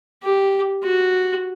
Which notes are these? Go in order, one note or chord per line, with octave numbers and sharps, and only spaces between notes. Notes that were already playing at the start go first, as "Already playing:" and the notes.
G4
F#4